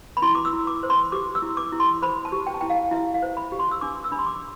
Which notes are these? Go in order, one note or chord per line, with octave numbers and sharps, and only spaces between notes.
B5
E4 C6
D6
E6
E4
D6
C5
C6
G4 D6
E6
E4
D6
E4
C6
C5 B5
A5
G4
G5
A5
E4 G5
F5
E4 E5
F5
C5
B5
G4
C6
E6
D4 D6
E6
D4 B5
C6
D6